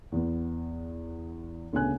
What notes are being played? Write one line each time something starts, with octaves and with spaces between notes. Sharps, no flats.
E2 B3
D2 C#3 B3 C4 G#5 F#6